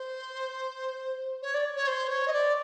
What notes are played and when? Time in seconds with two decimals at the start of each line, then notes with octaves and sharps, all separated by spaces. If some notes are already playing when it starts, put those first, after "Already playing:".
Already playing: C5
1.42 C#5
1.54 D5
1.76 C#5
1.87 C5
2.09 C#5
2.27 D#5
2.32 D5